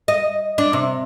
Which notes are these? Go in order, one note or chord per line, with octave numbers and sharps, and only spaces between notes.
D#5
D4
C3